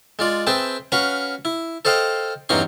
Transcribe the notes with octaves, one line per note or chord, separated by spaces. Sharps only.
G#3 F4 D5
C4 G#4 B4 E5 G5 A5
C#4 F#4 B4 F5
E4
A4 C5 D#5 F5 G5
E2 G2 F#3 C#4 D#4 C6